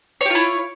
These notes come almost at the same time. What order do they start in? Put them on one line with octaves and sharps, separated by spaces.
C#5 G4 F4 E4